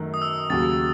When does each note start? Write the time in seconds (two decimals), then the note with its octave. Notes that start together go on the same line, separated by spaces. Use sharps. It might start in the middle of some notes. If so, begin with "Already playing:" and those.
Already playing: F#2 D#3 A3
0.14 D#6
0.22 E6
0.50 D#2 C#3 F#3 A6